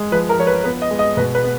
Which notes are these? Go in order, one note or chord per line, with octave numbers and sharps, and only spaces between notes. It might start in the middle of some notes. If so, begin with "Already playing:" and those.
Already playing: G#3
F3 B4
A#4
F3 C#5
B4
B3 B4
D#5
G#3
D#5
B2 B4
B4
B3